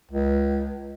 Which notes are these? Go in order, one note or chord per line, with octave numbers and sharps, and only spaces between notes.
C#2